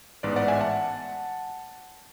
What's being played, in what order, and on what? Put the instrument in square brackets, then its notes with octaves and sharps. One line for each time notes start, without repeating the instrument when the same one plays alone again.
[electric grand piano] A1 G#2 G#3 B3 B4 D5
D5 F#5
E5 G#5
F#5 A5